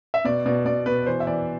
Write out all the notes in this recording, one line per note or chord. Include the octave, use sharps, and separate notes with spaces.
E5
B2 D5
B2 D5
B2 D5
B2 B4
E3 C5
E5
E3 D5